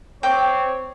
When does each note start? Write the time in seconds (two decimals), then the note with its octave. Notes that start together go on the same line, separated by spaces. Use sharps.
0.23 C4 C#5 G5 D6